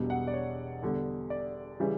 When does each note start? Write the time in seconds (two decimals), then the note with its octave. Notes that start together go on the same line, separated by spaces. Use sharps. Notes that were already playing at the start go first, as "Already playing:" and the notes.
Already playing: E1 E2 B2 G3
0.10 F#5
0.27 D5
0.34 C#5
0.82 E2 D3 G3
1.30 D5
1.80 C#3 E3 G3